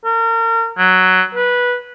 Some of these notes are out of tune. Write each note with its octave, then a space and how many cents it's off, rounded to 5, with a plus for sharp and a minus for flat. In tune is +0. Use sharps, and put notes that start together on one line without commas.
A#4 -35
F#3 +5
B4 -15